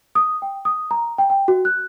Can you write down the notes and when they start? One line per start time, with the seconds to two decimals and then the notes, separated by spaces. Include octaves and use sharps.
0.15 D#6
0.42 G5
0.65 D#6
0.91 A#5
1.18 G5
1.30 G5
1.48 F#4
1.65 F#6